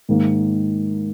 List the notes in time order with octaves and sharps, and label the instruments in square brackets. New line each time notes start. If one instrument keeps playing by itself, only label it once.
[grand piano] G#2 D#3 A#3